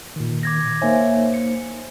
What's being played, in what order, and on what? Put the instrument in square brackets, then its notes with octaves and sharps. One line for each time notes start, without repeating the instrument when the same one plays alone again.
[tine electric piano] A#2 D#3
[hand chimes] D6 G#6 A#6
[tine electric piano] A#3 D#4 C5 [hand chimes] C#5 E5 G#5
[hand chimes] C#7